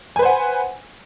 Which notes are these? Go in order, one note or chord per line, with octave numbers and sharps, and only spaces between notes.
B4 C5 F#5 G#5